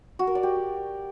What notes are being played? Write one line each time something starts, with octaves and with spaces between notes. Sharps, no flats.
F#4
A#4
D5
G4